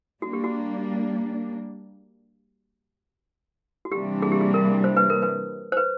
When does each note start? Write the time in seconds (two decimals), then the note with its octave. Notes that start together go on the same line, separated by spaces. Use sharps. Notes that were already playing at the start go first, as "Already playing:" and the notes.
0.22 G3 A#3 D4 F#4
0.33 G4
0.44 F#4
3.85 F#4
3.92 C3 E3 G3 A#3 D4 G4
4.22 G#4
4.32 G4
4.41 G#4
4.54 A#4
4.84 C5
4.97 B4
5.10 A#4
5.22 B4
5.72 C5
5.77 B4